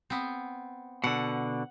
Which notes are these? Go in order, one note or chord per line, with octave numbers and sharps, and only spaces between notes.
B3 C4
B2 D3 F#5